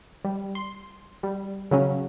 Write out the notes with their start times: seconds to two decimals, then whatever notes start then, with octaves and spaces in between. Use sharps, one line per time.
0.24 G3
0.55 C6
1.23 G3
1.71 C#3 F#3 C#4